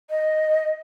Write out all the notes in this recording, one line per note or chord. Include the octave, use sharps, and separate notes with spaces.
D#5